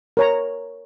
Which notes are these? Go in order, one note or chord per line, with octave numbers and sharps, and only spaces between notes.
A#4 C#5 A#5